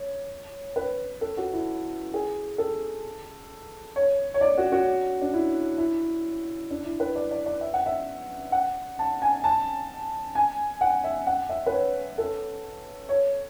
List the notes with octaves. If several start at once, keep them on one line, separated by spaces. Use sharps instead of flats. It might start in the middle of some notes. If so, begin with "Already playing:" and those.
Already playing: C#5
B4
A4
F#4
E4
G#4
A4
C#5
C#5
D5
F#4
F#4
D4
E4
E4
D4
E4
B4
D5
D5
D5
E5
F#5
E5
F#5
A5
G#5
A5
G#5
F#5
E5
F#5
E5
B4
C#5
A4
C#5